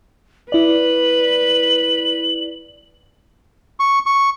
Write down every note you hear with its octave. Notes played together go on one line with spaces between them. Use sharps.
E4 B4 D5 F#7
C#6
C#6